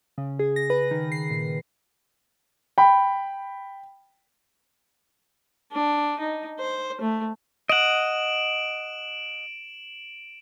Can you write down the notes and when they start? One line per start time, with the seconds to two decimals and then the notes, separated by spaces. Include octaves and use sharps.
0.18 C#3
0.39 G#4
0.56 A#6
0.70 B4
0.91 D#3
1.12 C7
1.30 A#2
2.78 G5 B5
5.72 D4
6.19 D#4
6.59 C5
7.01 A3
7.69 D#5 F#5 D7 E7 F#7